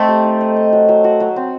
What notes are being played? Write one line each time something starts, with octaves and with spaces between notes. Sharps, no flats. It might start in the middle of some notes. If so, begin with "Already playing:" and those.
Already playing: A3 C4 A4 D#5
G4
D#4
D#4
D#5
F#3
F#3
F#4
F#3
C4